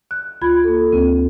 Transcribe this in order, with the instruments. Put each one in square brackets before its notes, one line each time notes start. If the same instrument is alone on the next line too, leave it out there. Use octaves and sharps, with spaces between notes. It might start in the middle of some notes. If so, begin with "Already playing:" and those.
[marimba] F#6
D2 F4 B5 G#6
A#3 A4
D2 C4